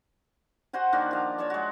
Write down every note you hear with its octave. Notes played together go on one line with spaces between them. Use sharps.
F#4 C5 F#5 G#5
D#3 A#3 D4 F#4
F3 F5
C#5 D5 A5 C#6
G#3 F#4